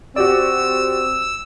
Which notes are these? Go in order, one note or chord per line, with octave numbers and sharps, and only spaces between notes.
C4 F#4 G4 D5 E6